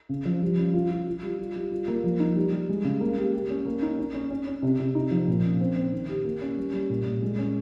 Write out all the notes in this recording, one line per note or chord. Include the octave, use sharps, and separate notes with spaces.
C#3
F3
G3
C#4
F4
F4
F4
G3
F4
G3
F4
A#3
F3
D#4
G3
G3
G#3
C#3
A#3
G4
G4
C#4
A#3
D#4
C#4
C#4
C#4
C#4
C3
C3
D#4
F3
A#2
C#4
C4
C4
D#3
G4
A#3
C#4
G3
G3
A#2
A#2
G#3
C#4